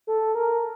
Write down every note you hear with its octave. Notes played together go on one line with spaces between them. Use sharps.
A4
A#4